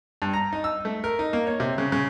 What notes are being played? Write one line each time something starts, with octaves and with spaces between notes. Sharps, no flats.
G2
A#5
D#4
E6
A3
A#4
D#4
A#3
C#5
C3
C#3
C#3